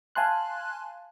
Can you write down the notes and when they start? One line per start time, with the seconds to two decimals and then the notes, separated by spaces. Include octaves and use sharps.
0.15 F5 G#5 A5 C6 F#6